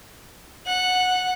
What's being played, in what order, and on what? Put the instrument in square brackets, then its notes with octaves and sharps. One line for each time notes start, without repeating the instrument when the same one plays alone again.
[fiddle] F#5 F#6